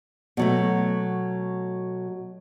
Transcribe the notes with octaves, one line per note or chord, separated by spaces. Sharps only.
B2 F#3 A3